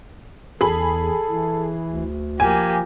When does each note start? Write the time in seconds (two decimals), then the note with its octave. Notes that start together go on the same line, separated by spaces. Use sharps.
0.61 E2 G#4 A4 B5
1.30 E3
1.85 D2
2.40 F3 A#3 G4 G#5